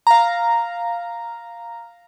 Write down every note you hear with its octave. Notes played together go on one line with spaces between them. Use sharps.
F5 A#5